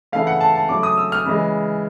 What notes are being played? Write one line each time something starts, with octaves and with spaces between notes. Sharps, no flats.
C#3 E3 A3 F5
F#5
A5
A5
C#3 F#3 A3 D6
D#6
E6
F6
C#3 E3 G#3